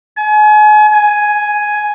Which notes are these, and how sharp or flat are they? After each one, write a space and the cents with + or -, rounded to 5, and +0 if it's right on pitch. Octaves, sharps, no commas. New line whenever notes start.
G#5 +35
G#5 +5